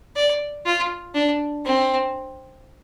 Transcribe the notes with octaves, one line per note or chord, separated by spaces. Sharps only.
D5
F4
D4
C4